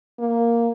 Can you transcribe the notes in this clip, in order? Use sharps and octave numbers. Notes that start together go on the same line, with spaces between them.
A#3